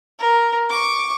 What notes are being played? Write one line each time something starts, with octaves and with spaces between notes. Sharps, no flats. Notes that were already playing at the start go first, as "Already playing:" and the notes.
A#4
C#6 D6